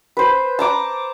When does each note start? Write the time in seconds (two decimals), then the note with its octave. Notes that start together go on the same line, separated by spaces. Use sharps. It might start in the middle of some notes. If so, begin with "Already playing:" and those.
0.17 B4 C5
0.59 A5 A#5 D6